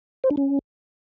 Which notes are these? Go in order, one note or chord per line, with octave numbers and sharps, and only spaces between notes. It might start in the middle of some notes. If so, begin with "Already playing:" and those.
C5
D4
C#4